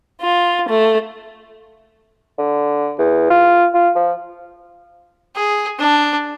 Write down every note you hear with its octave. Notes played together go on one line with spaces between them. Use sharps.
F4
A3
D3
E2
F4
F4
F3
G#4
D4